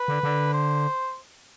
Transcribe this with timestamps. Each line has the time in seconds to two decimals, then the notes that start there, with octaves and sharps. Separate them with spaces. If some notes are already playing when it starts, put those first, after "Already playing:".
Already playing: B4
0.08 D3
0.23 D3
0.54 C5